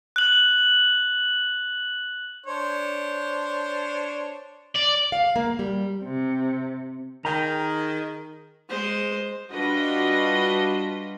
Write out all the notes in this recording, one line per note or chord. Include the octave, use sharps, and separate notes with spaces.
F#6 F#7
D4 C5 C#5
D5
F5
A#3
G3
C3
D#3 G#4 G5 A#5
G#3 C5
G3 D4 F4 F#4 B4 D#5